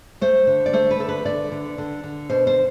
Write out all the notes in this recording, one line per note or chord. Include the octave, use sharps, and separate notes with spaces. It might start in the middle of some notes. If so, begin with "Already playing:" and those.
A3 C5
D3
D5
A3 C5
B4
D3 A4
B4
D3 D5
D3
D3
D3
B2 C5
C5